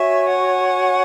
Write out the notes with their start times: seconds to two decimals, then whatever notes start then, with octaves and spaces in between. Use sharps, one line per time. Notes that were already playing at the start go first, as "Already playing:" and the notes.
Already playing: F#4 C#5 E5 G#5 C#6
0.29 F#5